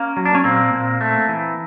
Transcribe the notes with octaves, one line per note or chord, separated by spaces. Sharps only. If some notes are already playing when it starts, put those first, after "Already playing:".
Already playing: A#3 C#4
F#3
D4
C#4
A#2 A#3 C4
A#2
A3
E3